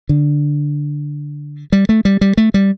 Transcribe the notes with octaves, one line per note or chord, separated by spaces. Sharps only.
D3
G3
A3
G3
G3
A3
G3